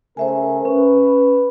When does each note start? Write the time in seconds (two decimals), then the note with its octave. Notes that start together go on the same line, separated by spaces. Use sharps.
0.17 C#3 A3 A#4 C5 E5 G#5
0.65 C#4 B4